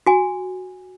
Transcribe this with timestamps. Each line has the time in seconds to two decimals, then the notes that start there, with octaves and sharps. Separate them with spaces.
0.07 F#4 G#5